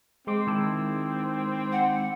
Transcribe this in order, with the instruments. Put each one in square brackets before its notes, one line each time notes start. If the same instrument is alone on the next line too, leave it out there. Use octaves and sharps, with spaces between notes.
[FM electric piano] G#3 C6 D6 [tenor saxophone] C4
[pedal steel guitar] D#3 E4 A5
[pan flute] F#5